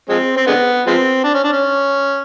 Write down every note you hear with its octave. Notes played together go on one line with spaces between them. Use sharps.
F3 G#3 C4
C4
D3 G#3 B3
F3 G#3 C4
D4
C#4
D4
C#4